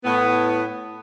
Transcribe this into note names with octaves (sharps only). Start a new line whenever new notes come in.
A2 B3